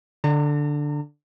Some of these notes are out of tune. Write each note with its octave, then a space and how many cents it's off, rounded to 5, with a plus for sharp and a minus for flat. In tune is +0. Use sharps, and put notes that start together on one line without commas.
D3 +0 A#5 -40